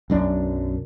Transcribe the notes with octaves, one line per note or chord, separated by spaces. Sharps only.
B1 F#2 D4